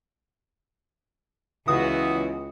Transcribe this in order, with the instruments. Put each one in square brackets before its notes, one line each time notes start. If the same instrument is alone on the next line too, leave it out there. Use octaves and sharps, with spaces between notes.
[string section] C#2 [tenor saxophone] E3 [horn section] B3 F#4 [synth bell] D#6